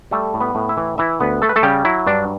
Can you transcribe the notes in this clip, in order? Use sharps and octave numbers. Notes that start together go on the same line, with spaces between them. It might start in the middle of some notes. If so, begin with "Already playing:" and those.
G3 A3 A4
A2
B3 B4
A2
E4 E5
E3
E3 E4 E5
D2 B3 B4
A3 A4
B4
A3 A4
C#3 G3 G4
F#3 E4
G2 D4